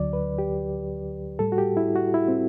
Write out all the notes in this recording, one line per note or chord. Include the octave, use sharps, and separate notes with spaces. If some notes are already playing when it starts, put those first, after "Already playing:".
Already playing: D2 D3 F#3 D5
B4
G4
A2 G3 A4
F#4
G4
E4
F#4
E4
C4